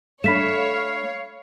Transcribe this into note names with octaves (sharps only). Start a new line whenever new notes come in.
A3 D4 C#5 F5 B5 B6 E7